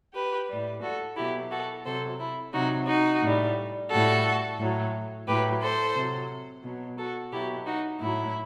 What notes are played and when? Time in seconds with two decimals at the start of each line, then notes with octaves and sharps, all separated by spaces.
0.13 G4 B4
0.48 A2 G3
0.82 F#4 A4
1.16 B2 F#3 E4 G4
1.50 F#4 A4
1.85 C3 F#3 A4 C5
2.19 E4
2.53 C3 F#3 D#4 F#4
2.87 D#4 F#4
3.22 A2 G3
3.90 A2 G3 F#4 A4
4.59 A2 F#3
5.27 A2 F#3 G4 B4
5.60 A4 C5
5.95 C3 F#3
6.63 B2 F#3
6.98 F#4 A4
7.32 B2 F#3 E4 G4
7.66 D#4 F#4
8.00 A2 F#3 E4